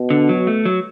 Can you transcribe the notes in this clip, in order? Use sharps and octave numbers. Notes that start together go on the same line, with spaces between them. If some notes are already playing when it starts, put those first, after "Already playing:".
Already playing: B2
D3
F#3
A3
F#3